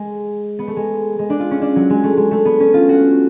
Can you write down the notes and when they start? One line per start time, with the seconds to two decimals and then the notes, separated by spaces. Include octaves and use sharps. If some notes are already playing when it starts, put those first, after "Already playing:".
Already playing: G#3
0.59 B3
0.67 A3
0.76 G#3
1.19 G#3
1.30 D4
1.40 F4
1.51 C#4
1.62 D4
1.76 F#3
1.90 G#3
2.04 A3
2.17 G#3
2.31 A3
2.45 B3
2.60 C#4
2.74 F4
2.89 F#4